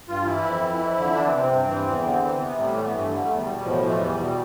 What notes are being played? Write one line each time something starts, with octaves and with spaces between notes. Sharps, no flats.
G2 F4
E3 E4
F2
E3
F2
D3
E3 D4
C4
C3
C4
G2
E3
E2
D3
E3 C4
C3 B3
A2 G3
E3 A3
B3
G2 A3
D3 G3
E2 A3
G3
B2
A2 F3
E3
A3
E2 G3
B2